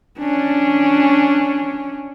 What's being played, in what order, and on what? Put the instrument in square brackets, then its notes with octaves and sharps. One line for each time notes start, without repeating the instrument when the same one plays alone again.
[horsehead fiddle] C#4 D4